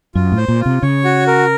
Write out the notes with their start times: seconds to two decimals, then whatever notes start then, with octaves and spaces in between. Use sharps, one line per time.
0.15 F#2 F4
0.32 A2
0.37 C5
0.48 A#2
0.60 F4
0.66 C3
0.82 C#3 C#5
1.04 F#4
1.27 A#4